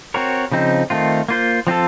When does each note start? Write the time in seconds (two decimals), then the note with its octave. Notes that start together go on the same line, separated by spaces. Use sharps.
0.14 C4 F#4 A#4 C#5
0.52 C#3 F3 C4 D#4
0.90 D#3 A3 C4 F4
1.28 A#3 F4 C5
1.67 F3 C4 F4 A4